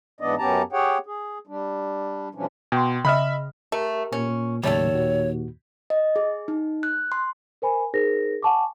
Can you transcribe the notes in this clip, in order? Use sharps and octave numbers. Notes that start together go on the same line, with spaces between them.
G#2 E3 B3 D4 D5 D#5
F#2 B3 C#4 G4 A5 A#5
G4 G#4 C#5 F#5 G5
G#4
G3 D4
B2 E3 F3 G3 C#4 D4
B2 G5 C6
C#3 D#5 E5 B5 F6
A3 G4 A#4
A#2 C#4
D#2 A2 C#3 F#3 G3 A3 A4 C#5
A#2 F#4
D#5
G#4
D#4
F#6
C6
A#4 C5 G#5 B5
D#4 G#4 A#4 C5 A#6
F#5 G#5 A5 C#6 D6